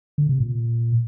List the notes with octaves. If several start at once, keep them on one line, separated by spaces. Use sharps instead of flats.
D3
C3
A#2